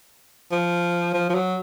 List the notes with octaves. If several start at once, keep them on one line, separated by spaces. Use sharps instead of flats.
F3
F3
F3
F#3